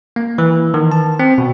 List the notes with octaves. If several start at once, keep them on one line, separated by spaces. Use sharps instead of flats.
A#3
E3
D#3
A5
C4
B2